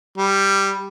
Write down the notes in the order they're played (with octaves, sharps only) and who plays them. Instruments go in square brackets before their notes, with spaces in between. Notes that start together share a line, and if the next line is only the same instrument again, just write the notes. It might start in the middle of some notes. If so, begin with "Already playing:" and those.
[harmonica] G3